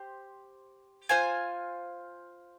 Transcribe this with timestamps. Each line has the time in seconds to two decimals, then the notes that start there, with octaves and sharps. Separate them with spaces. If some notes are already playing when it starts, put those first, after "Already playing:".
Already playing: G4 C5
1.09 F4 C5 F5 G#5